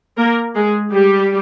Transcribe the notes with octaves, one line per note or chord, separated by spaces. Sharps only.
A#3 A#4
G#3 G#4
G3 G4